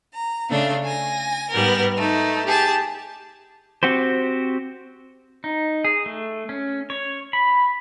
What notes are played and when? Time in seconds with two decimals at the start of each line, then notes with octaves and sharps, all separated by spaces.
0.13 A#5
0.50 C#3 A3 D4 F5
0.84 G#5 A#6
1.51 G#2 G3 B3 A#4
1.96 A3 D#4
2.46 G4 G#4 A5
3.83 C4 F#4 G4 C5
5.44 D#4
5.85 G#4
6.06 A3
6.49 C#4
6.90 C#5
7.33 B5